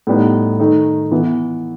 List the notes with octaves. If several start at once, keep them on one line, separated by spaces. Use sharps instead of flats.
A2 G3 B3 D#4
D#3 A3 D#4
E3 B3 E4